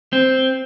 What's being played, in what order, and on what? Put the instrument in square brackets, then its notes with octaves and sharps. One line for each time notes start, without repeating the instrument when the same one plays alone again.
[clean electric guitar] C4